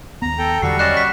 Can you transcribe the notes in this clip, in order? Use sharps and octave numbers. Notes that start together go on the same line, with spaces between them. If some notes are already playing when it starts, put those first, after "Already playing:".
D#2 B3 A#5
A4 G5
E2 D3 F#3 G3 F#4 A4 C#6 C7
C#4 D5 D#5 F#6 C7 E7
B6